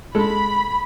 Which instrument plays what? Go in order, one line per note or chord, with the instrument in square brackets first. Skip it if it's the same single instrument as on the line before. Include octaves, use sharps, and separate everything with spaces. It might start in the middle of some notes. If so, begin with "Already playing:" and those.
[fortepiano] G#3 A4 [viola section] B5